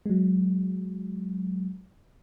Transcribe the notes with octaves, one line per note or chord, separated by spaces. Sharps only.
F#3 G#3